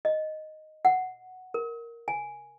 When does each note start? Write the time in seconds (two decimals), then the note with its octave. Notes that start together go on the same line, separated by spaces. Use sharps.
0.05 D#5
0.85 F#5
1.54 A#4
2.08 G#5